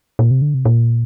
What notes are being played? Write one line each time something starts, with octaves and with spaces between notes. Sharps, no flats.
A#2
C3
D3
C3
A#2